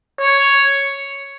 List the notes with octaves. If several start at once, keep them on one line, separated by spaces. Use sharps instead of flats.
C#5